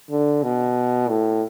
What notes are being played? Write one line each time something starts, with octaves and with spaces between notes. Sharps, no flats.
D3
B2
A2